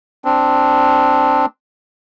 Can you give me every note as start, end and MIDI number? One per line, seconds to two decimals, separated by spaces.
0.25 1.46 60
0.25 1.46 62